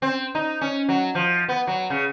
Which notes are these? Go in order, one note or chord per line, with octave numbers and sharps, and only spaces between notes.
C4
D#4
C#4
F#3
F3
B3
F#3
C#3